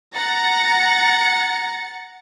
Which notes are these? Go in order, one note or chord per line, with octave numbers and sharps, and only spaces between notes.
F#5 A#5 A6 C#7